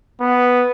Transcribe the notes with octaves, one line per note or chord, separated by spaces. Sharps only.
B3